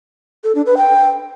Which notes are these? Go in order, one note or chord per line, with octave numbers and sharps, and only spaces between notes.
A4
D4
B4
G5